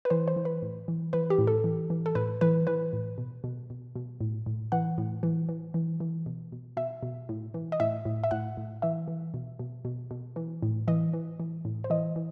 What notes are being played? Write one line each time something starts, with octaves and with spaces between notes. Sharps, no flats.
B4
E3 C5
C5
E3
B4
A2
E3
E3 B4
G4
A2
A4
E3
E3
A4
A2 B4
E3 B4
E3 B4
A2
B2
B2
B2
B2
A2
A2
E3 F#5
A2
E3
E3
E3
E3
B2
B2
B2 E5
B2
A2
E3
D#5
A2 E5
A2
E5
A2 F#5
A2
E3 E5
E3
B2
B2
B2
B2
E3
A2
E3 D#5
E3
E3
A2
C5
E3 D#5
E3